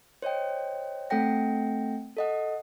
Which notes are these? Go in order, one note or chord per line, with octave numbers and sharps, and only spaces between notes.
C5 C#5 D#5 G5
A3 C4 A4 F#5 G5 A#6
A4 D#5 F#5